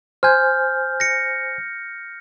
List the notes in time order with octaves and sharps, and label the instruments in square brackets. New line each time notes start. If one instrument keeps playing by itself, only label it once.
[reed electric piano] C5 G#5 [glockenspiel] F6 G6
[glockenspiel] A#6 C#7